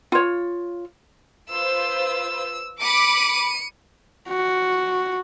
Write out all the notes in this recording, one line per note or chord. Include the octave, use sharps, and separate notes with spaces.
F4 C#5
F4 B4 C5 E6
B5 D6 C#7 D#7
F#4